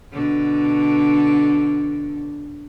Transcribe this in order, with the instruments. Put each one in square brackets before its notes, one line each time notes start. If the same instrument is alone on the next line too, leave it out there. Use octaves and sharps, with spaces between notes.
[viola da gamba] B2 D3 D4